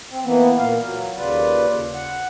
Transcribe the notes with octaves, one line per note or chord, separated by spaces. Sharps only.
C4
E3 A#3 B3
A#2 A#3 F5
F#3
D#2 C#3 F4 B4 D5
F#5